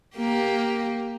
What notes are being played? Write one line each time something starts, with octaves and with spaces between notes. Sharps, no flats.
A#3 G4